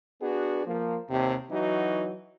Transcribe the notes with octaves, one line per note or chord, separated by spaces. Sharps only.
B3 D4 F#4 G#4
F3 A#3
D#2 C3
E3 F#3 D#4 F#4